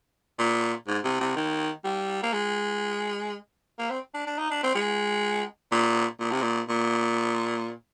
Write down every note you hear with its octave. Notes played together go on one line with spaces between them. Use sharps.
A#2
G#2
C3
C3
D#3
G3
A#3
G#3
A#3
C4
D4
D4
D#4
D4
C4
G#3
A#2
A#2
C3
A#2
A#2